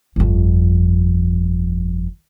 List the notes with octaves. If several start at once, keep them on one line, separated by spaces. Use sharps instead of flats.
G1 F2